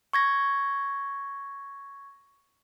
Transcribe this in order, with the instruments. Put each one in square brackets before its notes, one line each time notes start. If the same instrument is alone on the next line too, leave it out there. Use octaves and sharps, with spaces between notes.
[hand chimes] C#6 G#6 A#6